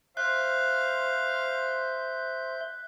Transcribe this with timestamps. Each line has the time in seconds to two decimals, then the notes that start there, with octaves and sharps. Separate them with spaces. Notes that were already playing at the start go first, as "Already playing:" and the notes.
0.17 C5 E5 F5 F#6 G6